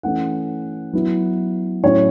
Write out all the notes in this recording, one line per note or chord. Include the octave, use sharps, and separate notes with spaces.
E3 A3 C#4 F#5
F#3 B3 E4
A2 F#3 C#4 E4 C#5